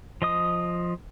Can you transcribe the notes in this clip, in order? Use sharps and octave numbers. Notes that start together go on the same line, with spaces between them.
F3 D#5 D#6